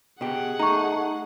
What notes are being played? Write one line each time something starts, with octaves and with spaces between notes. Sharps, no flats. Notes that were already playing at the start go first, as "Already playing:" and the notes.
B2 G4 G#4 F#5
A3 D#4 A#5 C#6